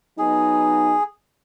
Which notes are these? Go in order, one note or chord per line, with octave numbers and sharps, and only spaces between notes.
F#3 B3 D#4 G#4